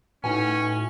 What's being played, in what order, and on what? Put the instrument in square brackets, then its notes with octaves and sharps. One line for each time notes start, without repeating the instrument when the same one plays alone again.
[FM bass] A2 [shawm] C#4 [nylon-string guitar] D#4 F#4 B4 [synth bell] G#5